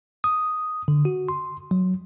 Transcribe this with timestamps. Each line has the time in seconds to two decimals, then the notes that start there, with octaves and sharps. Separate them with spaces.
0.24 D#6
0.88 D3
1.05 F#4
1.29 C6
1.71 F#3